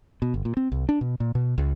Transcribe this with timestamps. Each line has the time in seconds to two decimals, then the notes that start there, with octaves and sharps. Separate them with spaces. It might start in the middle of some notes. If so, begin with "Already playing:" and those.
0.22 B2
0.34 G1
0.45 A#2
0.57 C4
0.72 C2
0.89 D4
1.01 B2
1.20 A#2
1.35 B2
1.58 C#2